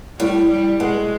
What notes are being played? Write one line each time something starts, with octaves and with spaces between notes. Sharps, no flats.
A2 G3
G3
B2 G#3